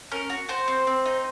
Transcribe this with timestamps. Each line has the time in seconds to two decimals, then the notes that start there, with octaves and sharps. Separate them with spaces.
0.12 C#4 A#4
0.30 F#4
0.49 F#4 C5
0.68 C4
0.87 C4
1.05 D#4